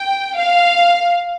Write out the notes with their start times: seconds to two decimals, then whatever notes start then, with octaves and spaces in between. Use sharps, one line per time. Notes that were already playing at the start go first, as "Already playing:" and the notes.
Already playing: G5
0.37 F5